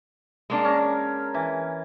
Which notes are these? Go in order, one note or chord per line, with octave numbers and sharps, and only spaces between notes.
G#3 A#3 D4
C#4 A#4
E3